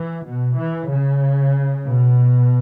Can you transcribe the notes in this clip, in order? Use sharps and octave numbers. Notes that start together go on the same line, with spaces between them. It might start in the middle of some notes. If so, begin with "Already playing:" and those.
Already playing: E3
B2
E3
C#3
B2